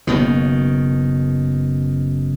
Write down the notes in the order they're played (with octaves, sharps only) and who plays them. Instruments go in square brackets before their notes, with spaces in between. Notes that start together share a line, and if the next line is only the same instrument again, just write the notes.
[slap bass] F#1 B2 D#3